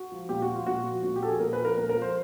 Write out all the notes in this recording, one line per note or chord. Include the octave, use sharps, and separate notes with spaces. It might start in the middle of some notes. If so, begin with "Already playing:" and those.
Already playing: F#4
F3
A#2 G4
F#4
F3
F4
A#2 F#4
F3
A#2 F#4
G4
F3 A4
G#4
A#2 A#4
B4
F3
A#4
A#2 A#4
A#4
F3
C5